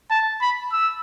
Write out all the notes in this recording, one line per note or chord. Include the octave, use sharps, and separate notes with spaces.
A5
B5
E6